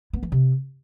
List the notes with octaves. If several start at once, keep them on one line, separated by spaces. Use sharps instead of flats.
B3
E3
C3